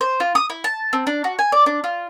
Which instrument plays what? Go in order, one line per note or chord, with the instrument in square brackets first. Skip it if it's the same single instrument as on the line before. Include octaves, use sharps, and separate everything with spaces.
[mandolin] C5
F4
D#6
E4
A5
C4
D4
F#4
G#5
D5
D4
F4